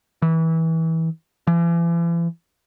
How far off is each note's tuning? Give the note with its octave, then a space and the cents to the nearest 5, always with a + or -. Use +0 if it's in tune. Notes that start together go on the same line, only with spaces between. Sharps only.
E3 -25
E3 +40